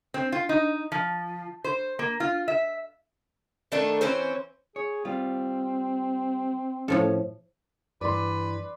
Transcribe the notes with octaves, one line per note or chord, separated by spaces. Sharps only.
C4
F4
D#4
F3
C5
A#3
F4
E5
D#3 A3 D4 A4
E3 C4 C#4 C5
G#4 C#5
G3 C4 F4
A2 F3 C#4 A4
G2 E3 B4 D5 C6